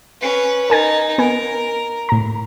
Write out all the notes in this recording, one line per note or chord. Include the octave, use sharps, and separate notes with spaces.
C#4 B4
D#4 A#4 G#5 A6
B3 A#4 B4 G#5
A2 A#5